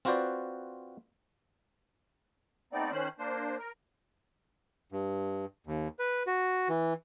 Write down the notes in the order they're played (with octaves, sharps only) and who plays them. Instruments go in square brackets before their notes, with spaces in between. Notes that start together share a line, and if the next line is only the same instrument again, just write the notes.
[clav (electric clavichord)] C4 F4 F#4 B4 C5 D5
[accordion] A3 B3 C4 D#4 D5
D#3 C#4 C5 F#6
A#3 D4 C5
A#4
[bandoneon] G2
D#2
B4
F#4
E3